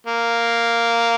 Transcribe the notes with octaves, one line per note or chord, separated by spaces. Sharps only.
A#3